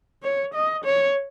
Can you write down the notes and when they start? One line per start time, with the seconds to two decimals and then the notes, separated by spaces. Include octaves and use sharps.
0.23 C#5
0.54 D#5
0.85 C#5